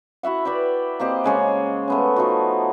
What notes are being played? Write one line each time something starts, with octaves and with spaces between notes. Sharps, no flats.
E4 F#4 E5 F#5
B4 D5 E5 G5
A#3 C4 G4 D#5
C#3 G#3 C#5
A3 B3 C#4
F3 D#4 F#4